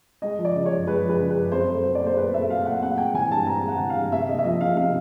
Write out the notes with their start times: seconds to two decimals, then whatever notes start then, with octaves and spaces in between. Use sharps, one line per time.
0.22 G#3 D#5
0.39 F3
0.45 D5
0.54 C#3
0.66 F#2 C#5
0.87 G#3 B4
1.03 F3
1.09 B4
1.20 C#3
1.30 B4
1.35 F#2
1.52 C4 C5
1.68 A3
1.75 C5
1.85 F#3
1.95 D5
2.01 A#2
2.06 C5
2.17 C4 B4
2.33 A3 E5
2.49 F#3 F5
2.65 A#2 F#5
2.82 C4 F#5
2.98 G#3 G5
3.14 E3 G#5
3.31 G2 A5
3.47 C4 A#5
3.63 G#3 F#5
3.79 E3
3.90 F5
3.96 G2
4.12 C3 E5
4.28 A#3 D#5
4.39 E5
4.44 F3 D#5
4.60 C3 F5
4.77 C3 F5